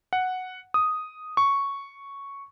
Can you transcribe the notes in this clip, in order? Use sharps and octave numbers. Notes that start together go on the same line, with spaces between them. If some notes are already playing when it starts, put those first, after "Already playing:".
F#5
D#6
C#6